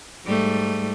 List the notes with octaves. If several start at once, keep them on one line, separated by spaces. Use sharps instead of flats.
G#2 G3 A3